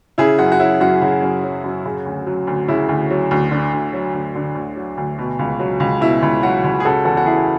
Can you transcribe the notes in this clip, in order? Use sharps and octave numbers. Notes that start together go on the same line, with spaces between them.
C#3 E4 G#4
F#2 F#4
F#4
F#3 E4
F#2 F#4
C#3 F#4
F#2
F#3
F#2
C#3
D2
F#3
D2
C#3 E4
D2
F#3
D2
D3
D2
F#3
D2
D3
D2
F#3
D2
B2
C#2
F#3
C#2
B2 E4
C#2
F#3 F#4
C#2
G#4
C#3 F#4 A4
E2 F#4 A4
F#4
E3 E4 G#4